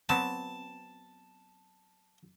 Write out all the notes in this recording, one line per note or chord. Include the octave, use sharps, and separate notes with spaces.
F#3 B3 C4 A5